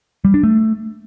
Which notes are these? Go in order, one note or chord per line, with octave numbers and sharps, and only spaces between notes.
G3
D4
A3